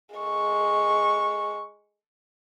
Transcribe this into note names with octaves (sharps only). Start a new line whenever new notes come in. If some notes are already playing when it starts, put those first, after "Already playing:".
G#3 C#6